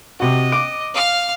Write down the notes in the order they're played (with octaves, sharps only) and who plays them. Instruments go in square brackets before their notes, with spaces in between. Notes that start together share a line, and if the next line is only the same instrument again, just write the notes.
[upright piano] C3 F#4 [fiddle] D#5
[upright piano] D6 D7
[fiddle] F5 F6